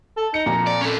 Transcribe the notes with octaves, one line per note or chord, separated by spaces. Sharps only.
A4
D#4 C#7
F2 A#2 A#5
D5
C#4 A4